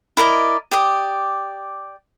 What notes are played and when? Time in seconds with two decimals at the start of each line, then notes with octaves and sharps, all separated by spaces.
0.17 E4 A#4 D5 D#5
0.71 G4 D5 D#6